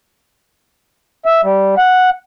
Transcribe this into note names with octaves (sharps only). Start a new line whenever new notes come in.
E5
G3
F#5